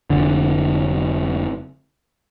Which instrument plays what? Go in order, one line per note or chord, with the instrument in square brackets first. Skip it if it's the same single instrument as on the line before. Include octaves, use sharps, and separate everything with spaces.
[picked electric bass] F1 D3